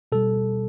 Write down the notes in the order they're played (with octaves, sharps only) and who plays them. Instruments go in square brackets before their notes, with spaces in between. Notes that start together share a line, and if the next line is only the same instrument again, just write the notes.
[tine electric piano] B2 G3 A4